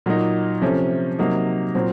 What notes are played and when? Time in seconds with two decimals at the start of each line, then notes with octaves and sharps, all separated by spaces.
0.06 A#2 F#3 A#3 D#4
0.62 C3 F3 A3 C#4
1.19 C3 F#3 A#3 D#4
1.75 A#2 F#3 C4